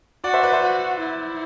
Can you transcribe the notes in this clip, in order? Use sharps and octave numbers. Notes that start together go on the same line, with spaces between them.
F#4 D5 F#5
C5 E5
B4 D5
C5 E5
F#4
E4